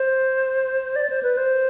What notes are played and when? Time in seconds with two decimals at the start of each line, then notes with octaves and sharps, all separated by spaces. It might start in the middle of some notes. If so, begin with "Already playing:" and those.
Already playing: C5
0.96 D5
1.10 C5
1.23 B4
1.37 C5